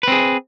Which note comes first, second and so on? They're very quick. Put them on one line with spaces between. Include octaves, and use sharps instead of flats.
B4 C4 G#4